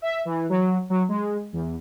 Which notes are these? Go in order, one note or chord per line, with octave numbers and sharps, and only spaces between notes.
E5
E3
F#3
F#3
G#3
E2